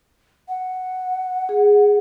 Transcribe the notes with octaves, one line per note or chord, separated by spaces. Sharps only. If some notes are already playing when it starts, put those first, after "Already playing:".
F#5
G#4